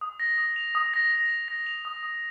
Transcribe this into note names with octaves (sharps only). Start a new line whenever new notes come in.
D#6
A#6
D#6
F7
D#6
A#6
A#6
F7
A#6
F7
D#6
D#6